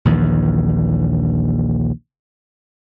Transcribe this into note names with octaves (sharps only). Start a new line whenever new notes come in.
A#1 D#2 E3